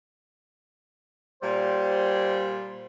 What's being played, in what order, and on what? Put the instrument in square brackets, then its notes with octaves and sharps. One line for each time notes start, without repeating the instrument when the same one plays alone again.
[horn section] A#2 G3 [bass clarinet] C5